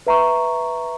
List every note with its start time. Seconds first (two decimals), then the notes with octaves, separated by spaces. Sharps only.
0.07 B4 E5 A#5 C#6